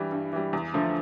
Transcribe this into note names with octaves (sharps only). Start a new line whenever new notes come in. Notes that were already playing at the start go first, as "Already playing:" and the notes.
Already playing: G2 E3 G3
G2
E3 G3
E2
D3 F3 A3